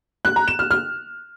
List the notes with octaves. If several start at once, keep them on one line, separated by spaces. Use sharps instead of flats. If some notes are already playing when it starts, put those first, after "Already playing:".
F#6
A#5
E7
F6
F6